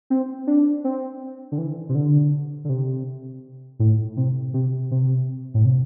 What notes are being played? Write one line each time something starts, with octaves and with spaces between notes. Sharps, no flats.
C4
D4
C4
D3
E3
C3
D3
D3
C3
A2
C3
C3
C3
A2
C3